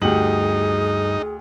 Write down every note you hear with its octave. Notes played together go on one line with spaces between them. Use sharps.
D2 G2 D#4 G4 G#4 F#5 F#7